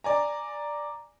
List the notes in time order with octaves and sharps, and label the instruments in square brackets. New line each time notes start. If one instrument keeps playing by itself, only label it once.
[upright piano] D5 G#5 A#5